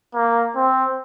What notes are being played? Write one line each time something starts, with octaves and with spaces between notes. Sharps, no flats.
A#3
C4